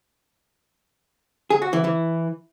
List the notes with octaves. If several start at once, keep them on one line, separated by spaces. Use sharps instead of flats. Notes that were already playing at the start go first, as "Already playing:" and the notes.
G#4
F#4
E3
E3